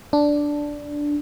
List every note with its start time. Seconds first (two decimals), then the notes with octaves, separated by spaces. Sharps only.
0.13 D4